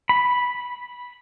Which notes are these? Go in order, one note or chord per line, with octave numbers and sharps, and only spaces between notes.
B5